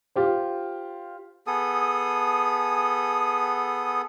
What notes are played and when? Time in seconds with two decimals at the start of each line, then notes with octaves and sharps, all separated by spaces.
0.16 F4 G4 C5
1.47 B3 G#4 A4 D#6